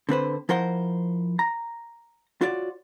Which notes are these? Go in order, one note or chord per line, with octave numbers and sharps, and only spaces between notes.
D3 C4 B4 C5
F3 E4 A#4 C5 F#5 C6
A#5
F4 F#4 C#5 D5